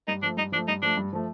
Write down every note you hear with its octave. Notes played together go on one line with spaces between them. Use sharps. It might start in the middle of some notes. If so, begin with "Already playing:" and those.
G2 D#4
F3 A3 D4
G2 D#4
F3 D4
A3
G2 D#4
F3 A3 D4
G2
F3 A3